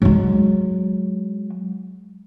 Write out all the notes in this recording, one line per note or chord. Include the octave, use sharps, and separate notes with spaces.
F#3 G#3